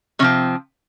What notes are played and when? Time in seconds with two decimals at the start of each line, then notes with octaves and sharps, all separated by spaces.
0.19 C3 C#4
0.22 F3 C4